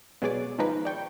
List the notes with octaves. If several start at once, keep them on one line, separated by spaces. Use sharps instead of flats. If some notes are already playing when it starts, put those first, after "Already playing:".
B2 F#3 G#3 G#4 D5 D6
D#3 F3 G#3 D#4 B4
D5 G5 C#6